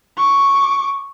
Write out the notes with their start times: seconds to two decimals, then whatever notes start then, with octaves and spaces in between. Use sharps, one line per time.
0.17 C#6 D6